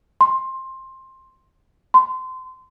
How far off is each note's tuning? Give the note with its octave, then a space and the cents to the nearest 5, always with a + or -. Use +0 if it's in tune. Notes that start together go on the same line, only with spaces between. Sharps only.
C6 +15
C6 -25